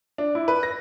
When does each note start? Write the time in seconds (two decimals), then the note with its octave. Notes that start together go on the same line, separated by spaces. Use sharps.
0.18 D4
0.35 E4
0.48 B4
0.63 A#6